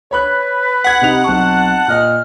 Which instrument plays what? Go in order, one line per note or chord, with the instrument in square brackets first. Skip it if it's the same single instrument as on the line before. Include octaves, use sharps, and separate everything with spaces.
[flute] B4 [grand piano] C#5 B5 F#6
[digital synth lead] F#5 [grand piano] G#6 B6
[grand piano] C3 D#4 F7
[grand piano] B1 C4 C#6 [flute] A5
[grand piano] A#2 D#5 [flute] F6